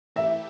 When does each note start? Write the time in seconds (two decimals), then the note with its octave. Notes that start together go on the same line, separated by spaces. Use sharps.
0.16 E3 A3 E4 G4 E5